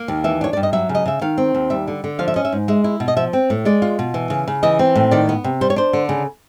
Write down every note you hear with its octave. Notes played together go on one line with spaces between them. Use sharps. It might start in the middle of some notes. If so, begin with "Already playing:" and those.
Already playing: A#3
D#2
E3 E5
D4 C#5
G2 D5
D#5
F#3 E5
C#3
D#5
C#3 E5
D#3 F5
C4
D#2
G3 E5
D3
D3
F3 F5
E5
C#4 D#5
E5
G#2
G#3 E5
E4
B2
D#5
F3 E5
C4
A2
G#3 D5
F4
B2
E3
C#3
C#3
E3 D#5
C4
A2
D#3 D5
B3
C3
G3 C5
C#5
D4 C5
D3
C#3